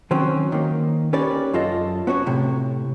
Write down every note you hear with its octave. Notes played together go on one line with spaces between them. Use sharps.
D#3 F#3 C4 C#4
D#3 A#3
C#4 G4 A#4 B4 C#5 D5
F#2 F4 A4 D#5
B3 C#4 F#4 C#5
A2 C3